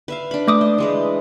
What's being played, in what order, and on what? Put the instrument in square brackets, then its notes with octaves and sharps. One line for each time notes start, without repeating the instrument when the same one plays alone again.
[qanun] B4 E5 F5
D4 B5
[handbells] A3 D6 D#6
[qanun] C5
E3 G#3 B4